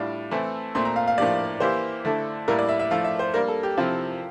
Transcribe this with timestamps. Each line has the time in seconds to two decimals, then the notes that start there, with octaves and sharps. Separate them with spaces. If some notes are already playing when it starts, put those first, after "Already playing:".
Already playing: A2 G3 D4 F4
0.31 E3 A3 C4 E4 A4
0.75 A#2 A3 C4 C6
0.85 A#5
0.96 F5
1.07 F5
1.18 A2 F3 A#3 D4 G4 D5
1.60 E3 A#3 E4 G4 C5
2.05 D3 A3 E4 A4
2.48 A2 G3 A#3 E4 A#4
2.59 D5
2.69 E5
2.79 E5
2.91 F3 A3 E4 F5
3.04 E5
3.19 C5
3.34 G3 A#3 D4 A#4
3.48 A4
3.63 G4
3.77 C3 F3 C4 E4 F4